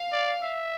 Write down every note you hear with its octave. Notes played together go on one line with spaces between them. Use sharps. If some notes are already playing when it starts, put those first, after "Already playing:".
Already playing: F5
D5
E5